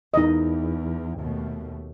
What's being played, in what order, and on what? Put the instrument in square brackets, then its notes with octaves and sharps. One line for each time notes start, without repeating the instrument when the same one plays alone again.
[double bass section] E2 [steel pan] D#4 D#5
[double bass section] D#2 B2 A3